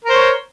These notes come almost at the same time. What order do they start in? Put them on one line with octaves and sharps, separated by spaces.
A#4 C5 C#5